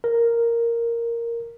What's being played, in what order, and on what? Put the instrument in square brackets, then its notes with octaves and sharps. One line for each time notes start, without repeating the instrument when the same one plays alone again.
[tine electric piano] A#4